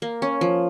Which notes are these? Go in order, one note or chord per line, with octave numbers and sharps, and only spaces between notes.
A#3
C#4
F3